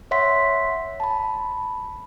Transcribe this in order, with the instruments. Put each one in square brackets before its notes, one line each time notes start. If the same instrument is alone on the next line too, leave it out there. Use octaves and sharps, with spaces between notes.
[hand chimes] C#5 E5 F#5 C6 B6
A5 B5